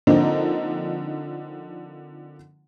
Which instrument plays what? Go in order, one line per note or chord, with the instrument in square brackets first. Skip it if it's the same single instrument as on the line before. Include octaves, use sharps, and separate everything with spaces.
[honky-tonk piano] D3 F3 A#3 C4 D4 D#4